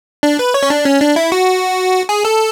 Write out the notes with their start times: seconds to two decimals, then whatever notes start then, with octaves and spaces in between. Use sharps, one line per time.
0.23 D4
0.39 B4
0.54 C#5
0.63 C#4
0.70 D4
0.86 C#4
1.00 D4
1.16 E4
1.32 F#4
2.09 G#4
2.25 A4